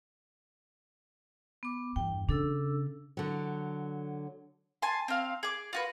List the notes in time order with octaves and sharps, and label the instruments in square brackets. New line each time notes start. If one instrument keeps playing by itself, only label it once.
[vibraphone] B3 D6
[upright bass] E2 G2 [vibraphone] G5
[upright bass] C#3 [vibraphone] D4 A4 E6
[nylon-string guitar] D3 F#3
[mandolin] G#5 A5 C6
C4 F5
G#4 D6
F4 F#4 B4